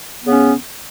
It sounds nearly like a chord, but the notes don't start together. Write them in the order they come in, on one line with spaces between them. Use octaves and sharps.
B3 C#3 C#4